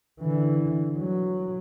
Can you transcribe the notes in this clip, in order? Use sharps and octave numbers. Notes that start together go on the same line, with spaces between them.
D3 E3
F#3